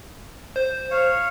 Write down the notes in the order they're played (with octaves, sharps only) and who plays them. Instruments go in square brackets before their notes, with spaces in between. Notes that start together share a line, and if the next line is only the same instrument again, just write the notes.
[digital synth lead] C5
[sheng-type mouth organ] C#5 F5